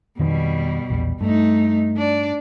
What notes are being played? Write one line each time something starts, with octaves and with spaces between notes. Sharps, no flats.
F2 B2 D#3 G3 B3
A#1 E2
G2 A3 D#4
D4 D5